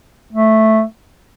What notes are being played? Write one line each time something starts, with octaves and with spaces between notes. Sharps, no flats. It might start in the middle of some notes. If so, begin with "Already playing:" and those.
A3